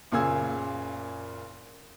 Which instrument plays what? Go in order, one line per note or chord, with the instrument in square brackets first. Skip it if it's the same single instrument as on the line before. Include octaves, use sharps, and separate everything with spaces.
[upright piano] F#1 A#2 C#3 G#4 E6 G#6